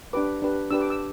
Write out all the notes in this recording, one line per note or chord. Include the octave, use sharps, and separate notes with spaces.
D4 G4 B4 D6
D4 G4 B4
D4 G4 B4 E6
D6
E6